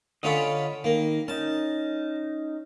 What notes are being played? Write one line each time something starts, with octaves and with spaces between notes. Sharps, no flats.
D3 C#4 F4 D#5 B5
D#3 A#3
C#4 D#4 A5